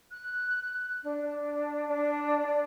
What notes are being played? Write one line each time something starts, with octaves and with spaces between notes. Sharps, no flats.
F#6
D4
D4
D5